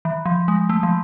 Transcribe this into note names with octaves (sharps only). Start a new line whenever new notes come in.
E3
F3
G#3
A3
F3